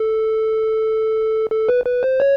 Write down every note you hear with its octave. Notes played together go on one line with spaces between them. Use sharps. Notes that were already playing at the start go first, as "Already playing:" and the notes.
Already playing: A4
A4
B4
B4
C5
C#5